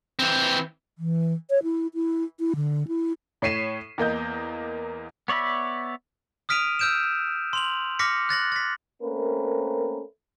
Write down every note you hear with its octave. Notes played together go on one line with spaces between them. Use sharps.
E3 C4
E3
C#5
E4
E4
E4
D3
E4
A2 C#5 B6 C7 D#7 E7
E2 A#3 D#5 G6
B3 C#5 D5 E5 B5
D#6 F6 B6 D7 D#7 F7
E6 F6 G6 D7 E7
C6 F7 F#7
D6 F6 A#6 B6 C#7
F#6 A6 A#6 F#7
A6 B6
A3 A#3 C4 C#4 A#4 B4